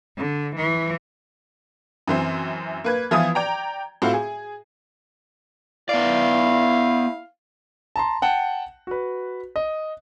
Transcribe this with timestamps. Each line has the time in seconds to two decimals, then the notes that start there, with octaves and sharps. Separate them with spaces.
0.17 D3
0.55 E3
2.08 F#2 E3 C4
2.84 A#3 B4 G#6
3.11 E3 F3 B3 F4 D#6 G#6
3.35 D5 G5 A#5
4.02 A2 C4 F4 F#4
4.14 G#4
5.89 B3 E4 D5 F5
7.96 A5 A#5 C6
8.22 F#5 G5 A5
8.87 F#4 B4
9.56 D#5